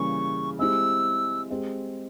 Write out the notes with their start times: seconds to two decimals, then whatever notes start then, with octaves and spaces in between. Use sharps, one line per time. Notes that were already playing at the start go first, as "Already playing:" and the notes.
Already playing: C#3 E3 G3 A#3 C#6
0.59 G#3 C4 E4 G4 E6
1.50 G#3 C4 G4